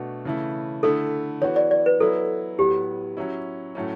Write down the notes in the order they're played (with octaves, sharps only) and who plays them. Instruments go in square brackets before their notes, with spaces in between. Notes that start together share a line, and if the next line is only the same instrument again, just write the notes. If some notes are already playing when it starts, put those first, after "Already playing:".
Already playing: [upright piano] B2 A3 D4 F#4
C#3 E3 A3 E4
[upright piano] D3 A3 E4 [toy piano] A4
[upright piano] E3 B3 F#4 [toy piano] C#5
[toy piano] D5
D5
B4
[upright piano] F#3 B3 E4 [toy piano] A4
[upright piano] A2 F#3 B3 [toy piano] G4
[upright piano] F#3 C#4 E4
A2 F#3 A3 C#4